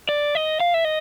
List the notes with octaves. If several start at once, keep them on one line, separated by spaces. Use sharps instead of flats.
D5
D#5
F5
E5
D#5